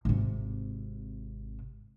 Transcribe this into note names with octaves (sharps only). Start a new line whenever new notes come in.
G#1 C3